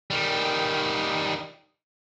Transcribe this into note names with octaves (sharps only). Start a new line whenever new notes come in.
D#3 G3